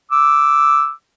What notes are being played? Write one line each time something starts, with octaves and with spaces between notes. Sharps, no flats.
D6 E6